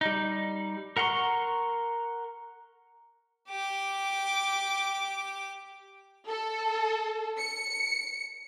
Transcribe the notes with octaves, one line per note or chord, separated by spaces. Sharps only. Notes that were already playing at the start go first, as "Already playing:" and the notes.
G3 D#4
A#4 F#5 A#5 C6 C#6
G4 D6
A4
C#7